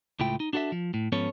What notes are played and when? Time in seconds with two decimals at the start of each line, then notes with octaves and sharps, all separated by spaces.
0.20 C#2 A2 A3 E4 F4 G5
0.40 D#4
0.53 D4 F#4 A4 C#5 E5
0.72 F3
0.94 A2
1.12 G#2 F3 B3 C#4 A4 C#5